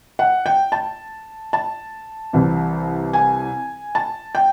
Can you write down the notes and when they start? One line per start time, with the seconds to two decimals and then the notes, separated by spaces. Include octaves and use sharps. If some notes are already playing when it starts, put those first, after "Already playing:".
0.19 F#5
0.46 G5
0.72 A5
1.53 A5
2.33 C2 C3 E3
3.13 G#5
3.95 A5
4.35 G5